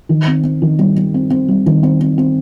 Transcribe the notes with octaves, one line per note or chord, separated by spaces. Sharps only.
D#3
C4
C4
D#3
G3
G3
C4
C4
G3
D#3
C4
C4
C4